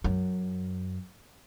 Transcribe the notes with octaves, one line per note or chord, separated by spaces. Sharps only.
F#2